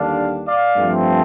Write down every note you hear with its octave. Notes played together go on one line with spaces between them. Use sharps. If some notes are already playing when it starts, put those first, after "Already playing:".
Already playing: D#2 D3 G3 D4 D5 F5
D5 F5
G2 F3 A3 C4